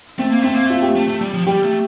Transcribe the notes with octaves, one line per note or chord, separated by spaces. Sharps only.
A3 C4
A#3
A3 C4
A#3
A3 F4
G4
A3
A3
G3
F3
G3 G4
A3